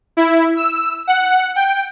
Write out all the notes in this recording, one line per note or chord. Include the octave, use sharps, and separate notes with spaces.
E4
E6
F#5
G5